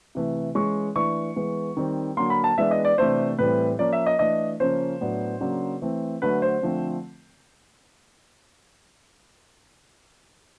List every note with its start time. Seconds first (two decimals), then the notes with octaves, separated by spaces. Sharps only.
0.15 C3 E3 A3
0.55 E3 G#3 C#4 C#6
0.95 E3 A3 D4 C#6
1.36 E3 G#3 B3
1.77 D#3 G3 C4
2.17 D3 F#3 A#3 C6
2.30 B5
2.44 A5
2.58 E3 G#3 B3 D4 E5
2.71 D#5
2.85 D5
2.98 C3 E3 A3 D4 C5
3.38 A2 E3 G3 C4 B4
3.79 F3 A#3 C#4 D5
3.93 E5
4.06 D#5
4.19 E3 A3 D4 D#5
4.60 C#3 F3 A#3 C#4 C5
5.01 A2 F#3 B3 D4
5.40 C#3 F#3 A#3 D4
5.82 E3 A3 C4
6.22 D3 F#3 A3 B4
6.42 C5
6.62 D3 F3 A3 C4